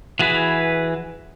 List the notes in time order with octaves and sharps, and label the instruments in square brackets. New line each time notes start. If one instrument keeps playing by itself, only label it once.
[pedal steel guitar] E3 F#4 G#4 B4